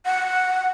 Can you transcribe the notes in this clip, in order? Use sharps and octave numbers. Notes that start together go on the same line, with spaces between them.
F#5